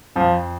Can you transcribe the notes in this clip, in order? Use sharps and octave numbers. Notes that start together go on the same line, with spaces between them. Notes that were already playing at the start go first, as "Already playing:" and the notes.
F2 F3